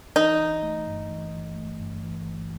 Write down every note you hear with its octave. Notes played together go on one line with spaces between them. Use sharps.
E3 D#4
G1
A3
G2
E3
G1
A3
G2
E3
G1